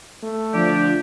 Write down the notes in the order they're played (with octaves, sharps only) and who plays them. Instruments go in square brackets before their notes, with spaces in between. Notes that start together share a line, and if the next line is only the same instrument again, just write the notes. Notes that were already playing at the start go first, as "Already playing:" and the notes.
[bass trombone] A3
[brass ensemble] D3 D4 [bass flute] F3 [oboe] G4